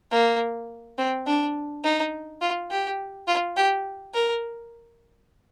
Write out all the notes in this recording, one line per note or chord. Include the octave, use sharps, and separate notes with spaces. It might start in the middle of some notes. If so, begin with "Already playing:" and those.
A#3
C4
D4
D#4
F4
G4
F4
G4
A#4